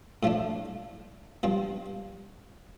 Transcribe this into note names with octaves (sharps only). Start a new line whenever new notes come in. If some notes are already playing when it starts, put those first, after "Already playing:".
A2 F3 A3 D4
G2 F3 C4